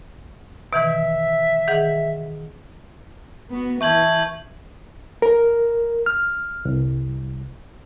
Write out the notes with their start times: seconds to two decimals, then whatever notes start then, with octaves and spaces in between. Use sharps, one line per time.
0.73 B2 D#3 E3 E5
1.68 D#3 G#4 F#5
3.50 B3 F#4
3.81 E3 E5 A5 C#6 G6 G#6 F#7
5.22 A#4
6.06 F6
6.65 C2